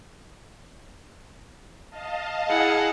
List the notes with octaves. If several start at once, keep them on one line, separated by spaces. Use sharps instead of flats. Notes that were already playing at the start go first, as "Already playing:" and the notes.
D#5 F5 A5
E4 G#4 F#5